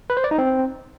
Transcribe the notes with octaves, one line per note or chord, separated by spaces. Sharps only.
B4
C5
D5
D#4
C4